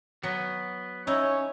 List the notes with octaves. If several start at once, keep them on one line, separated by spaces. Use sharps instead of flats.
F#3 B3
C#4 D#4 E4 C#5